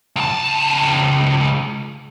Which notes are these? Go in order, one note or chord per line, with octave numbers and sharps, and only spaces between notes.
C#2 A5